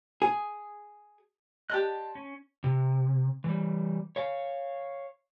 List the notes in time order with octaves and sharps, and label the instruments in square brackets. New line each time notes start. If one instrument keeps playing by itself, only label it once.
[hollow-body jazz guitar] G#4
[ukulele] G4 D5 D#5 [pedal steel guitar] A5 C6 F#6
[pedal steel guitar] C#4
[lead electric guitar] C3
E3 G3
C#5 F5